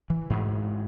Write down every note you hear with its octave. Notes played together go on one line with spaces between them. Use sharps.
E3
G#2